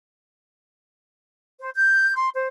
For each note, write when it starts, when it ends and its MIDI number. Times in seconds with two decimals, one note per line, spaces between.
1.60 1.70 72
1.75 2.14 91
2.15 2.28 84
2.35 2.48 72